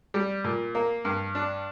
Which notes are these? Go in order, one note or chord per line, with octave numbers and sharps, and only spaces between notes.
G3
A#2
A#3
G2
D4